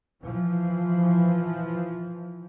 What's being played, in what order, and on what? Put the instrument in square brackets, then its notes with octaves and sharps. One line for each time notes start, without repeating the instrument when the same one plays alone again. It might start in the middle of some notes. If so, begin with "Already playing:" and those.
[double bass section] E3 F3